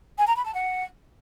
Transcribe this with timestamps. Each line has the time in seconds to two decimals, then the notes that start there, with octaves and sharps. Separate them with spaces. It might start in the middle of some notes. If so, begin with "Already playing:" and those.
0.18 G#5
0.27 A#5
0.36 B5
0.45 A5
0.54 F#5